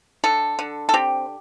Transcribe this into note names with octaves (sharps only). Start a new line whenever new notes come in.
D3 A4
D3
A4
C4 G4